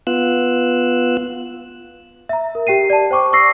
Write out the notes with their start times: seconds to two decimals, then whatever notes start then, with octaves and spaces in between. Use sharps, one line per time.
0.07 B3 F4 E6 F#6
2.29 E5 A#5
2.55 A#4
2.67 G4 G5 C7 D#7
2.90 D5 A5
3.11 C5 G5 C#6 D6
3.33 C#6 E6 A#6 C7